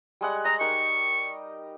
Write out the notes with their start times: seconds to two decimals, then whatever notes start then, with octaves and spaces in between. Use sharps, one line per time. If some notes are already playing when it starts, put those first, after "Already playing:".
0.21 G3 G#3 F#5
0.45 D#5 A#5
0.60 D#4 G4 A#4 C#6